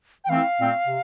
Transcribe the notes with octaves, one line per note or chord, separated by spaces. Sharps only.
G5
E3 A3 C4 E4 F5
A#2 A3 C4
C3